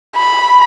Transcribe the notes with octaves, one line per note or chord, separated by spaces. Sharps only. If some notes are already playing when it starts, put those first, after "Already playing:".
B5